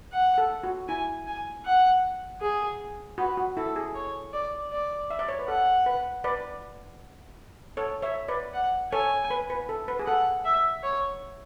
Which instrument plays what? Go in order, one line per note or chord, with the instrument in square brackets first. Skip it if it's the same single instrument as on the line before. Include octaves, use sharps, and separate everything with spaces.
[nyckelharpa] F#5
[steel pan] A4
F#4
[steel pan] E4 [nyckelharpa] G#5
[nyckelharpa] G#5
F#5
G#4
[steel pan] F#4 [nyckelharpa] B4
[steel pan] F#4
[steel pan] E4 [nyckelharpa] A4
[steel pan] G#4
[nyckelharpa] C#5
D5
D5
[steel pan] E5
D5
C#5
B4
[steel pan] A4 [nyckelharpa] F#5
[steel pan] B4
B4 D5
A4 C#5
C#5 E5
B4 D5
[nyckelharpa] F#5
[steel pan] A4 C#5 [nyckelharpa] G#5
[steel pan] B4
B4
A4
B4
G#4
[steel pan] A4 [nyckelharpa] F#5
[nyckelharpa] E5
C#5